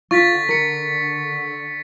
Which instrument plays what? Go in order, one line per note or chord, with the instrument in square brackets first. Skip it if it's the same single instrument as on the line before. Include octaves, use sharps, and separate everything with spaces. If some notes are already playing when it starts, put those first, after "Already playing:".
[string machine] D3 [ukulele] F4 [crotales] C#6 A6 B6
[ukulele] A#4 [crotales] A6 C#7